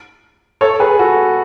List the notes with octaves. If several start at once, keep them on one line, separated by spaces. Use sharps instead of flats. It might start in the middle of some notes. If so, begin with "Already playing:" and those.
A4 C#5
G#4 B4
F#4 A4